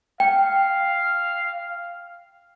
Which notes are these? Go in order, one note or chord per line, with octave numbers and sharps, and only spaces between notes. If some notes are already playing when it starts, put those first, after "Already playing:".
F5 G5